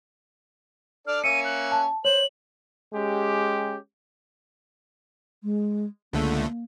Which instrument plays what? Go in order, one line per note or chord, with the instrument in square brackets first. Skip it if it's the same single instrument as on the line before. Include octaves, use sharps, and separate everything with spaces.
[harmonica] D4 A4 D5 [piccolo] F6
[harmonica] A#3 C#4 E5 [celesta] C#7 [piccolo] D#7
[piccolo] F#6
[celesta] A5
[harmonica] C5 [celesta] C#5 [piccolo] F#7
[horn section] G#3 C#4 G4
[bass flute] G#3
[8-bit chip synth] C#2 D3 A3 [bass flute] A#3